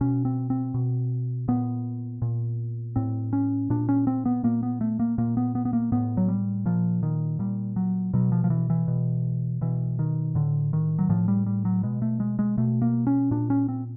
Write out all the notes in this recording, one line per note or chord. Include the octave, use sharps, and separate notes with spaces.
B2 C#4
C4
C4
B2
A#2 B3
A#2
A2 C4
C#4
A#2 D4
C#4
C4
B3
A#2 A#3
B3
A3
A#3
A#2 A#3
B3
B3
B3
A#3
A2 B3
F#3
G3
A#2 F3
D#3
A#2 G3
F#3
B2 F#3
F3
F3
E3
E3
B2
B2 E3
D#3
A2 D3
D#3
F#3
A2 F3
G3
G3
F#3
B2 G#3
A3
G#3
G#3
B2 A3
A#3
C#4
A#2 D4
C#4
C4